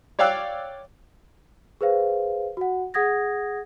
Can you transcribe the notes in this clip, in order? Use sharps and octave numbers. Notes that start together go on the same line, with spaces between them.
C#5 D5 F5 G5 E6 F#6
G#4 B4 C5 F5
F#4 F#5
G#4 F#5 D#6 G#6 A#6